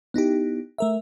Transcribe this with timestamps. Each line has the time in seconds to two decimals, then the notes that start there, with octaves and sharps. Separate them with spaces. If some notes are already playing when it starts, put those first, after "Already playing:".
0.14 B3 D#4 E4 G4
0.78 A3 A#4 E5